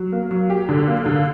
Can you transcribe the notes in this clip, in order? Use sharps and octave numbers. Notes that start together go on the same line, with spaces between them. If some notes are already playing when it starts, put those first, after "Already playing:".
Already playing: F#3
A#3
F#3
G4
D3
A#3
D3